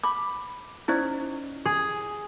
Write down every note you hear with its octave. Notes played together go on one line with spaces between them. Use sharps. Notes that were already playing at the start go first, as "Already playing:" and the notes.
B5 D6
C#4 D#4 E4 C5 D5
G#4